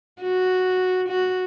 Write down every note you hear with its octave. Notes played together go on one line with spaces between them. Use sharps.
F#4
F#4